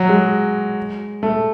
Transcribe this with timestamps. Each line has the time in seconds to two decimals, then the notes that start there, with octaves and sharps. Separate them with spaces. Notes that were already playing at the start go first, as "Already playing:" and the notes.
Already playing: F#3
0.09 G#3
1.23 A3